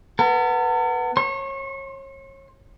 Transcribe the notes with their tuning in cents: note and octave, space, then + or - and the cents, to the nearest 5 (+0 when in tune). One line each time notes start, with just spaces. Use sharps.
B3 +0 A#4 -45
C#5 -30 C6 +25